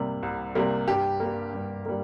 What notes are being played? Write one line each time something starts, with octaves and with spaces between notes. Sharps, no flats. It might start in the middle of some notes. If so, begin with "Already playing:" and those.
Already playing: C2 C3 G3 A#3
C2
C3 G3 A#3
G2 G4
G3 A#3
G2
G3 A#3